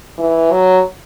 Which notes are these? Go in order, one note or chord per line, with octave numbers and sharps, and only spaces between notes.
E3
F#3